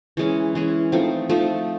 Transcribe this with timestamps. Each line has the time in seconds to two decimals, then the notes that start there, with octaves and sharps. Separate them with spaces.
0.17 E3 G#3 C#4
0.55 E3 G#3 C#4
0.92 F3 A3 C4 D#4
1.29 F3 A3 C4 D#4